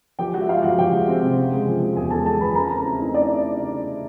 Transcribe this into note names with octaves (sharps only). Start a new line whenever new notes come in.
F3 G4 G5
G#3 F#4 F#5
E5
G#3 F4 F5
F3 F#4 F#5
F3 G4 G5
G#3
C4
C3
C#3
G#3
F3
G#3
E2 G#4 G#5
G#3 A4 A5
G#3 A4 A5
F3 B4 B5
C#3 A#4 A#5
C4
C4 E4 E5
A3 D#4 D#5
C#3 D4 D5
C#3